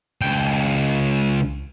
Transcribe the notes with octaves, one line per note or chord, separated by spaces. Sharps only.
C#2 G5